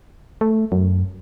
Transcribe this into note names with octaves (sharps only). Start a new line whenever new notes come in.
A3
F#2